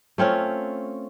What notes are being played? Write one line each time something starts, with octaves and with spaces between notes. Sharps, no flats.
A3 C4 C#4 F4